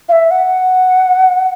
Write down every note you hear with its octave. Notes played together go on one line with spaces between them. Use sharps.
F5
E5
F#5